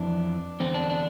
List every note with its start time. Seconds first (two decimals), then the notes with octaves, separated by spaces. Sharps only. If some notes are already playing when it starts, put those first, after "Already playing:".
Already playing: F2 E3 D4
0.60 E2 D3 C4
0.74 D4
0.90 D4